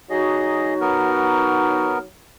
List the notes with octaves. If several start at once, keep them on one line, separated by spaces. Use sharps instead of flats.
F#3 D#4 F#4 G#4 D#5
B3 A#4